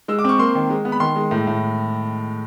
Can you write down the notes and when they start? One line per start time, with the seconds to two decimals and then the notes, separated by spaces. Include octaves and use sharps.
0.08 G#3 E6
0.19 D6
0.24 C4 C#6
0.39 A#3 C6
0.55 D#3
0.70 G#3
0.85 B3
0.92 B5
1.00 D#3 C6
1.16 G#3
1.31 A2
1.47 A2